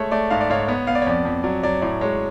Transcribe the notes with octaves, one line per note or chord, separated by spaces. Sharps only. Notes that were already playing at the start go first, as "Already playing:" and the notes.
Already playing: G#3 A3 C#5
A3 D5
G#2 F5
D5
G#2 C#5 F5
B3 C#5
B3 F5
D5
C#5
F2 D5
F2
F#3 D5
F#3 D5
A2 D5
G#3 C#5